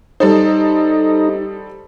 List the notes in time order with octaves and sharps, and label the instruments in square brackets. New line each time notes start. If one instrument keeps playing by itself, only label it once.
[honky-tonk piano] G3 A4 C5 [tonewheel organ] D#4